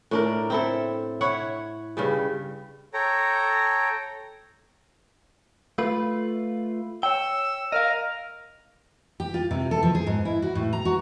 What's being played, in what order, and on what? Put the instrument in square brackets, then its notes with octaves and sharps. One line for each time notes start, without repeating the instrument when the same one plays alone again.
[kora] A2 D4 A#4
C4 E4 A4
E4 C#5 F#5
G2 C#3 G3
[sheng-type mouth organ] A4 C#5 G5 A#5
[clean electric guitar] A3 F4 B4
[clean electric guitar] C#5 G5 [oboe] E6
[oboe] A#4 [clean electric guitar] D#5 F5
[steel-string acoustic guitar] G4
F4
C3
A4
F3
G#4
G#2
E4
F#4
A2
A#5
F#4